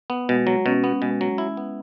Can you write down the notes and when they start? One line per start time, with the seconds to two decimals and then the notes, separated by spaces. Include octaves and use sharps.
0.10 B3
0.29 B2 G#3
0.47 F#3
0.66 B2 C#4
0.84 B3
1.02 B2 G#3
1.21 F#3
1.38 E4
1.57 B3